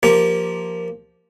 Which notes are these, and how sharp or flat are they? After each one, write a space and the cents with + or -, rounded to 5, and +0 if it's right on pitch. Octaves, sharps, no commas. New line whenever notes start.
F3 +0 A#3 +0 G4 +0